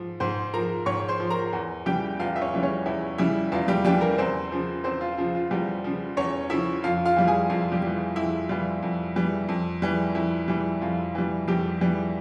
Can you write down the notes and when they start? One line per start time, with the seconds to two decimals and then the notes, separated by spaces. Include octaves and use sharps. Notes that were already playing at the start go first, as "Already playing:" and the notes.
Already playing: G#2 F3
0.20 G#2 C5 C6
0.54 F3 A#4 A#5
0.86 G#2 C#5 C#6
1.08 C5 C6
1.20 F3
1.30 A#4 A#5
1.53 E2
1.86 C#3 E3 G3 G4 G5
2.20 E2 F4 F5
2.36 E5
2.41 C#4 C#5
2.53 C#3 E3 G3
2.63 C#4 C#5
2.86 E2 E4
3.18 C#3 E3 G3 E4
3.52 E2 F4
3.68 G3 G4
3.85 C#3 E3 G3 G4
4.01 A#3 A#4
4.18 E2 C4 C5
4.52 C#3 F3
4.84 E2 C4 C5
5.01 F4
5.17 C#3 F3 F4
5.35 F4
5.51 E2 G3 G4
5.84 C#3 F3
6.17 E2 C#4 C#5
6.50 C#3 F3 E4 E5
6.84 F2 F4 F5
7.06 F4 F5
7.17 E3 G3
7.28 G#4 G#5
7.49 F2 F4 F5
7.72 G3 G4
7.82 E3 G3
7.94 F4
8.16 F2 E4
8.49 E3 G3 F4
8.82 F2
9.16 E3 G3
9.49 F2
9.82 E3 G3
10.15 F2 E4
10.48 E3 G3
10.81 F2 F4
11.15 E3 G3
11.48 F2 G3 G4
11.81 E3 G3